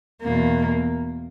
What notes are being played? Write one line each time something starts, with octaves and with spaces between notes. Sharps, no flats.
E2 B2 A#3